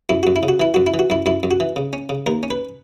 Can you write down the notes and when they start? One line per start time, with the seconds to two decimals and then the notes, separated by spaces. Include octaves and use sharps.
0.09 F#2 E4
0.23 F#2 F#4
0.36 E4
0.43 C#3
0.48 F#4
0.60 E3 E4
0.74 F#2 F#4
0.87 E4
0.94 E3
0.99 F#4
1.10 F#2 E4
1.26 F#2 E4
1.43 F#2
1.51 F#4
1.60 E3
1.76 C#3
1.93 C#4
2.09 C#3
2.27 D#2 A#4
2.43 C#4
2.51 B4